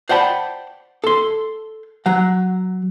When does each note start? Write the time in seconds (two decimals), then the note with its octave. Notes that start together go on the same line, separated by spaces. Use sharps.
0.09 C5 D5 F#5 G5 A5 B5
1.04 A4 C6
2.06 F#3 F#5